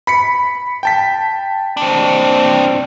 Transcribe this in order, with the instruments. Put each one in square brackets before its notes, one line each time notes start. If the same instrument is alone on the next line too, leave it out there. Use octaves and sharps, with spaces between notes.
[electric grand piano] B5 B6 C#7
G5 A5 B6
[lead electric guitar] C4 D4